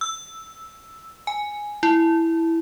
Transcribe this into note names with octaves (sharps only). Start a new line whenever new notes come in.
E6
G#5
E4